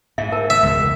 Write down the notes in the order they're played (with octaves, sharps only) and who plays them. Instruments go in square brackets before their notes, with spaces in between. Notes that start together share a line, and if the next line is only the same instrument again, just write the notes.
[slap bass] G#2 [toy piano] E5
[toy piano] A#4 A5
[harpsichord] E5
[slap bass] E1 C#2